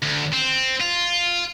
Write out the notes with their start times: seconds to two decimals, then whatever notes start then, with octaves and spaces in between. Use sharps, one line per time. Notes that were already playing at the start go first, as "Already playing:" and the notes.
0.03 D2
0.34 C4
0.81 F4